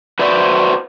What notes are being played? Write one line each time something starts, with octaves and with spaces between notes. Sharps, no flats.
F#4 B4 C5 D5 E5